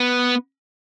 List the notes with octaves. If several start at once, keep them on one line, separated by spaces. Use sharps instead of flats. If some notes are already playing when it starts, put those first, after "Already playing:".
Already playing: B3